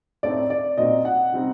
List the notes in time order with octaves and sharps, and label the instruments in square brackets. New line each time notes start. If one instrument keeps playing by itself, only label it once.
[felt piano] A2 A3 C4 D#4 [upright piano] D5
[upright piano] D5
[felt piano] A#2 F#3 C4 D#4 [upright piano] D#5
[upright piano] F#5
[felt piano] C3 G3 C4 D#4